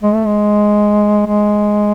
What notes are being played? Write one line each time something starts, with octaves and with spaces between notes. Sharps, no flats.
G#3
A3
G#3
G#3